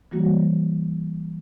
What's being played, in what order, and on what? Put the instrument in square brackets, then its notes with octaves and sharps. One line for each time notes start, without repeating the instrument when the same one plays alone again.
[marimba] E3 F#3 G3 A#3 F#4